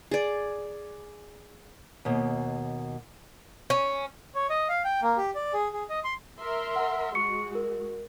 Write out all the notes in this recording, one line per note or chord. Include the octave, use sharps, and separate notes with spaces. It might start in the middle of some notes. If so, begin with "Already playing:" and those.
G#4 D5
D#2 B2
C#4
C#5
D#5
F5
G5
A#3
G4
D5
G#4
G#4
D#5
C6
A#4 E5 C6
F#5
G#3 F#4 C#6 C#7
A#4